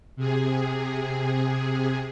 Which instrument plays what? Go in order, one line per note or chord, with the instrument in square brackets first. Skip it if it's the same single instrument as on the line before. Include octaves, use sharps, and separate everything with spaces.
[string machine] C3 G#4